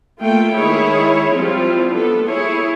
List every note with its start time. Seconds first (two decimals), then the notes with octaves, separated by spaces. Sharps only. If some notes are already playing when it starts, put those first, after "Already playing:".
0.19 A3 A#3 F4 G5
0.54 D#3 G#3 E4 G#4 C#5
1.33 F3 G3 C4 E4 F4
1.91 B3 D4 A4
2.26 E4 G#4 C#5